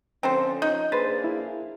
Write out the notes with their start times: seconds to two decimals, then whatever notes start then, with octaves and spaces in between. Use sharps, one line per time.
0.23 D3 F3 C4 C#4 A4 C5 G5
0.62 D#4 G6
0.92 A#3 D4 G#4 B4 C5 A6
1.24 E4